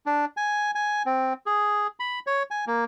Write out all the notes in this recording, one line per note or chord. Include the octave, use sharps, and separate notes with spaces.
D4
G#5
G#5
C4
G#4
B5
C#5
G#5
A#3